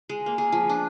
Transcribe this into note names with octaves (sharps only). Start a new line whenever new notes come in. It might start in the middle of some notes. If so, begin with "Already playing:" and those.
G#3
A#3
G#4
F3
D4